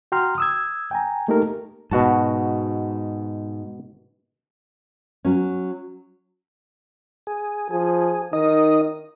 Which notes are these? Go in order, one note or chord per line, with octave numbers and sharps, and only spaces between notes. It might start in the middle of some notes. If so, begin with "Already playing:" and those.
F#4 G5 A#5 C6 F6
D#6 E6 G#6
G5 G#5 A#5
A3 A#3 D#4 G4 A4 A#4
G#2 B2 F#4 A5
F#3 C#4
G#4
F3 G#4
D#3 D#4 D#5